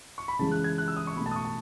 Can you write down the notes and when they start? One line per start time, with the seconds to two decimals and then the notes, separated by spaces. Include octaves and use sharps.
0.18 C#6
0.28 B5
0.39 C#3 E3 G#3 A5
0.51 F#6
0.64 G#6
0.78 F#6
0.88 E6
0.97 D#6
1.07 C#6
1.16 B2 A3 B5
1.26 A5
1.31 D#6
1.36 C#6
1.45 A5